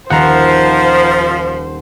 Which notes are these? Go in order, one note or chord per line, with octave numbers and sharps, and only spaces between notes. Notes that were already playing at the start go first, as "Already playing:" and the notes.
D#1 F3 C5 F#5 A#5